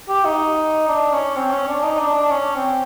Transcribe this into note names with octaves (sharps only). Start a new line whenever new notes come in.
G4
D#4
D4
C#4
C4
C#4
D4
D#4
D4
D4
C#4
C4